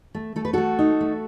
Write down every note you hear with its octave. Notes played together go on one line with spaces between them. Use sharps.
A3
A3 A4
B4
A3 F#4 A4
D#4
A3